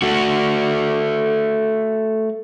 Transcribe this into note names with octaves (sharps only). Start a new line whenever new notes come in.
A3 F#4